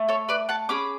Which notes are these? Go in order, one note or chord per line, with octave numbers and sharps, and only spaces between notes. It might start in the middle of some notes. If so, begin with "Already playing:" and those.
Already playing: A3
A4 C#5
B4 D5
F#5 A5
C#4 G#4 B5 D6